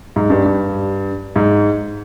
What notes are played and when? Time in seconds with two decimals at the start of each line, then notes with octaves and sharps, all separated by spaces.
0.16 G#2
0.30 G2
0.46 G2
1.36 G#2